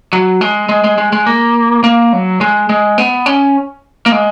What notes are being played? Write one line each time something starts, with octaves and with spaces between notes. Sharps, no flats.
F#3
G#3
G#3
G#3
G#3
G#3
A#3
A#3
F#3
G#3
G#3
B3
C#4
A#3
G#3